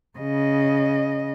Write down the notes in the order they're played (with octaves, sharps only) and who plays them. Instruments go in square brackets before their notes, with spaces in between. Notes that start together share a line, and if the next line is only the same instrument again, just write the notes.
[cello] C#3 D#5